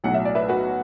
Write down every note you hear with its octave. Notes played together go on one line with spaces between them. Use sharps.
B1 A2 F#3 F#5
E5
D5
B4 E5
F#4 B4